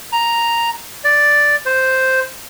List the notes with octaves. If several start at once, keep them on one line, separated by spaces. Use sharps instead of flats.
A#5
D5
C5